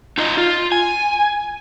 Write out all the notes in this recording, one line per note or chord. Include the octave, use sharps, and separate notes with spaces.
D#4 F4 D#5
F4
G#5